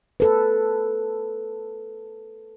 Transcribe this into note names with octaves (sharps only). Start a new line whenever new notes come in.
A4 B4